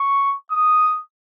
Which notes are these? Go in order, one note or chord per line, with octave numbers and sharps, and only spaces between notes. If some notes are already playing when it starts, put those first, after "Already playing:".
Already playing: C#6
D#6